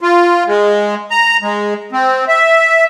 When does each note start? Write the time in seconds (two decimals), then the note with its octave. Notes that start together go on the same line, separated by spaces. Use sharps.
0.01 F4
0.47 G#3
1.11 A#5
1.42 G#3
1.92 C4
2.28 E5